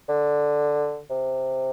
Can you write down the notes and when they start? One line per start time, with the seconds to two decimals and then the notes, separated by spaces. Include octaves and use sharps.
0.09 D3
1.10 C3